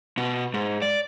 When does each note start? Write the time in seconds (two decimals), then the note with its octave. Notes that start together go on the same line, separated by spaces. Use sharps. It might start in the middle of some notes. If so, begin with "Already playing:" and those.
0.18 B2
0.54 G#2
0.82 D5